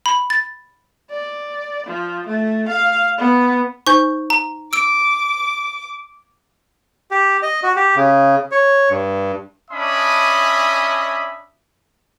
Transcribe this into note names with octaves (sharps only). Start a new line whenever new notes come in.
B5
A6
D5
F3
A3
F5
B3
D#4 C5 G#5 C#6 G6
A#5
D6 E6 D7
G4
D#5
F#4
G4
C#3
C#5
G2
C#4 D4 D#5 E5 B5 D#6